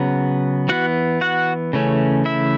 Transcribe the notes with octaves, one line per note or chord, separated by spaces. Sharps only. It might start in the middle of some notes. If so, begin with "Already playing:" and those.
Already playing: C#3 F#3 B3
E3 B3 F#4 F#5
F#4 F#5
C#3 E3 A3 C#4
E4 E5